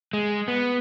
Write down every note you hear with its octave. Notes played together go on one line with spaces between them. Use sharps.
G#3
B3